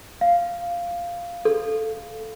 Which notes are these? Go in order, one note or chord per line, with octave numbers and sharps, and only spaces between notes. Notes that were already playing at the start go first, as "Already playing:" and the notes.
F5
A4